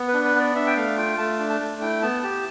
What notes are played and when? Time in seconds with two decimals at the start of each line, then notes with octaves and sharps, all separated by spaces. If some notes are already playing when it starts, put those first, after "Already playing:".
Already playing: B3
0.08 B4
0.14 D4
0.24 B4
0.35 B3 D5
0.55 D4 E5
0.67 G5
0.77 A3 F5
0.97 F4 G5
1.18 A3 A5
1.39 D4
1.50 A5
1.60 A3
1.81 E4 G5
2.02 B3 A5
2.23 G4 A5